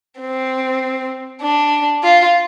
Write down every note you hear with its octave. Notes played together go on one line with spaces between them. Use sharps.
C4
D4
F4